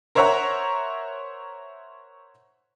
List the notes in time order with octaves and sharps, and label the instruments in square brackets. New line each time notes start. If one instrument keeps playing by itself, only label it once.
[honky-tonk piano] A#4 C5 C#5 E5 F#5 A#5